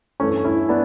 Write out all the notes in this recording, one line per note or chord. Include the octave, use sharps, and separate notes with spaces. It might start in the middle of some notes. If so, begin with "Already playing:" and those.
G2 E3 A3 C#4
C#4 E4
B3 D4